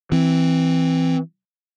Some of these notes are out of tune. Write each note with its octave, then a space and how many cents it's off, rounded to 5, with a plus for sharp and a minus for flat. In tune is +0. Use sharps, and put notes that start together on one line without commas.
E3 -5 C4 +0